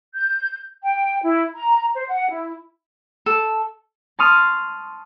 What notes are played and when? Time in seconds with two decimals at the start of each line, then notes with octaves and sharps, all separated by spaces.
0.15 G6
0.83 G5
1.23 E4
1.56 A#5
1.95 C5
2.09 F#5
2.30 E4
3.26 A4
4.19 A5 C6 C#6 D#6 F6